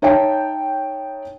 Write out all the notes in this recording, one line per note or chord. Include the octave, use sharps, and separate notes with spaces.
D#4 C#5 E5 G5 A5